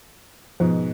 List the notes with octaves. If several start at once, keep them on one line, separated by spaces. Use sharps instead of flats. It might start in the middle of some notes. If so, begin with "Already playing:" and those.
G#2 B2 F3